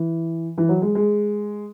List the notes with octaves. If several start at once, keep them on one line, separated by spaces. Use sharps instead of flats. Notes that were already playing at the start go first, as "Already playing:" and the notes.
Already playing: E3
E3
F#3
G#3
G#3